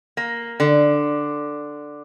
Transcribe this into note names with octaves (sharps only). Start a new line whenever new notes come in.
A#3
D3